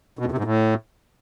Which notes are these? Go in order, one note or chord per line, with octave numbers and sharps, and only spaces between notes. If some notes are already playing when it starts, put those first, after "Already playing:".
B2
E2
C3
G#2
A2